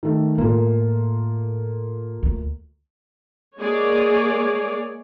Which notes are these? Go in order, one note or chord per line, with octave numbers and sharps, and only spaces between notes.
D#3 A3
A2 A#3 F4 A4
D2
G#3 A#3 G#4 C#5 D5